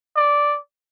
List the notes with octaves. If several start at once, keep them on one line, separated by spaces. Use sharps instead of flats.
D5